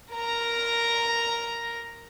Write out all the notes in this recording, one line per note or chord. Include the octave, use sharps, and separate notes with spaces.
A#4 A#5